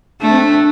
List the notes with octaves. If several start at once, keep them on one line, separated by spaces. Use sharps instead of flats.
A3 D4
C4
D4